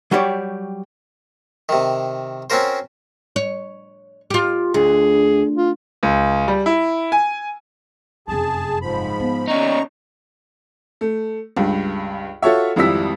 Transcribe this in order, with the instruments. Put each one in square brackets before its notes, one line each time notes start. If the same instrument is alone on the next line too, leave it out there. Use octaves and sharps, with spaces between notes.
[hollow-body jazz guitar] F#3 G3 G4 C#5 D5
[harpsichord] C3 D#3
C4 C#4 F#4 A#4 C5
[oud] C#5
F4 G4
[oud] D2 [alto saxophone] G#4
[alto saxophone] F4
[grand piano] C#2
G3
E4
G#5
[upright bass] F1 F#2 [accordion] G#4 A5
[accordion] G#2 F3 B5
[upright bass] B3
[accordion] D#2 A#5 C#6 [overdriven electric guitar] C#4 D#4
[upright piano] A3
C#2 G2
F4 F#4 A4 C#5 E5
G#1 F2 G3 E4 E6 B6